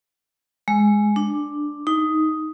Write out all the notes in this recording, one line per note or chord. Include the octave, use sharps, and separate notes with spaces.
G#3
D4
D#4